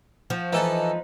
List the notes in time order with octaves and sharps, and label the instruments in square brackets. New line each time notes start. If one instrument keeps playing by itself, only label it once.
[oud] F3 [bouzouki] F#4
[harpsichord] E3 A4 [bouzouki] D#4 B4